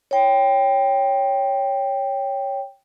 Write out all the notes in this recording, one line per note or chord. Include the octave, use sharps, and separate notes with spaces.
C#5 G5